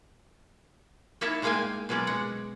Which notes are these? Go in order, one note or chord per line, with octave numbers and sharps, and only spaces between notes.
A#3 D#4 E4 C#5 E5 A5
A2 G#3 A#3 F5 G5 G#5
B2 F#3 G#3 C#4 D5
G#3 F#5